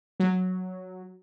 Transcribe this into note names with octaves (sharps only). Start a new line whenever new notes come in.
F#3